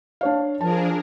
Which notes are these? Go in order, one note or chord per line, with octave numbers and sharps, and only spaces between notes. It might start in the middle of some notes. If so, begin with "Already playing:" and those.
D4 C#5 F5
F3 D4 G#4 A#4 A5